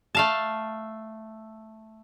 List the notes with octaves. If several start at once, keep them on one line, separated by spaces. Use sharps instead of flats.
A3 F5 A5